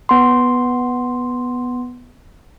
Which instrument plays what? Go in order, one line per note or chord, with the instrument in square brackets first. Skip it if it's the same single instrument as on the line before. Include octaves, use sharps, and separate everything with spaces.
[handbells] B3 C6